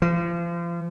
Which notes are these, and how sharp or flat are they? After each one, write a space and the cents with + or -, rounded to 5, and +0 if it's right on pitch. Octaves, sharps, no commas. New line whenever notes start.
F3 -35